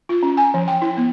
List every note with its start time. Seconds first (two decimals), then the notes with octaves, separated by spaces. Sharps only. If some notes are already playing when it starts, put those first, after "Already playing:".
0.09 F4
0.23 C#4
0.37 G#5
0.54 F3
0.68 G5
0.82 E4
0.97 B3